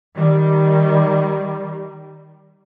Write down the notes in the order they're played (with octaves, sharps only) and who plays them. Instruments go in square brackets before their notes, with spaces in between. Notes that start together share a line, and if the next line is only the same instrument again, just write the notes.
[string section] D#3 G3